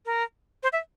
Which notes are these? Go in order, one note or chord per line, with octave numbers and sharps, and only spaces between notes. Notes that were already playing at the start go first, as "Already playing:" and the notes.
A#4
C5
E5